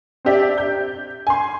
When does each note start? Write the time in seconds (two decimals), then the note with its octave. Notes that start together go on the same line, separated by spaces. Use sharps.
0.25 C4 D4 G4 D5 E5
0.58 G6
1.27 G#5 C6